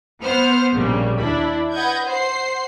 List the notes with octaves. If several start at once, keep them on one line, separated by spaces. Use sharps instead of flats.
B3 C5 F6
A#1 C#3 G3 A#3
D#2 D4 E4 B5
B4 D#5 F#5 G6 G#6
C5 F#5 C7